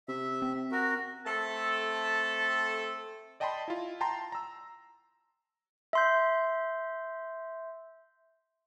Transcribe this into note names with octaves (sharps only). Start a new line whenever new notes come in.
C3 E5
C4
F#4 A#4
A3 C4 A4 A5
D5 D#5 G5 A5 B5 C6
E4 F4
G5 A5 A#5 C6
A#5 E6
E5 C6 G6